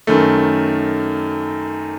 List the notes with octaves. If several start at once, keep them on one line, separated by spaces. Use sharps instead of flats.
F#2 D#3 A3